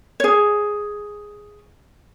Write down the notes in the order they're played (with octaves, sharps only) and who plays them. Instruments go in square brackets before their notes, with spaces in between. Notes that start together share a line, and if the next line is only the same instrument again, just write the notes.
[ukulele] G#4 C#5